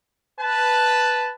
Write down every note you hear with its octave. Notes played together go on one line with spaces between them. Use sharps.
B4 A5